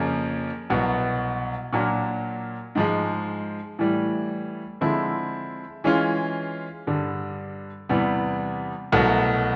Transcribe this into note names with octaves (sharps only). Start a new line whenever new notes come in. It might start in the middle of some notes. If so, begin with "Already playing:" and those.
Already playing: F2 C#3 F3 A#3 C#4
C2 B2 F#3 B3
A#2 F#3 A#3 D4 F4
G#2 F3 G#3
A2 E3 G3
D3 F3 G#3 C4 E4
E3 G#3 C#4 F4
G2 D3 G3
E2 C3 E3 G3 B3
C2 B2 F#3 A3